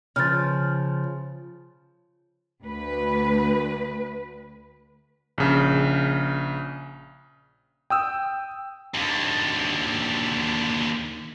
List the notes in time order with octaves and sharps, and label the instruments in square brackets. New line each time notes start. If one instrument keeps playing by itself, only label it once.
[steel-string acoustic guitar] C#3 F3 [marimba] F6 A6
[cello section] D2 B4
[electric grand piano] A#1 C#3
G5 D#6 E6
[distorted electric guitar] D#2 D3